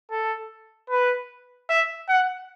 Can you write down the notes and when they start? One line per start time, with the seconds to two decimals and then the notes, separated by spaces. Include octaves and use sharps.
0.11 A4
0.90 B4
1.69 E5
2.08 F#5